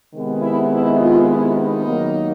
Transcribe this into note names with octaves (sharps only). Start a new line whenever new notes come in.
C3 D#3 G#3 B3
E4
E4
F4
E4
D#4
D#2 D#3 F#3 A#3